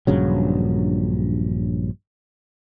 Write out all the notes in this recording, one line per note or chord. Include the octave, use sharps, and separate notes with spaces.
A#1 G2 C#3 F#3